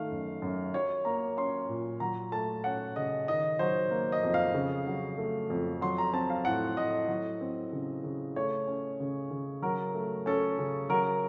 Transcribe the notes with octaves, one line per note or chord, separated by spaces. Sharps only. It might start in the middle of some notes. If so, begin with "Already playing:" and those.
Already playing: D#3 A3 F5
F#2
F#2
F#3 C#5
A#3 A#5
C#4 C6
A#2
F#3 A#5
A3 A5
C#4 F#5
C#3 D#5
D#3 D#5
F#3 C5
A#3
D#5
F2
F5
C#3
F#3
A3
F2
F#3 C6
A#5
C4 A5
F5
A2 F#5
A2 D#5
F#3
C4
C#3
C#3
A3 C#5
C#4
C#3
C#3
F#3 A#4
A3
C#4 A4
C#3
F#3 A#4